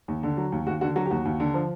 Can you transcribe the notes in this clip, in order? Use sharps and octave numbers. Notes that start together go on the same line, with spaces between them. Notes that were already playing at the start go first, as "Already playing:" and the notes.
D#2
D3
F#3
D#2
D#2 F#4
D3 F#4
F#3 F#4
G4
D#2 F#4
D#2
D3
F3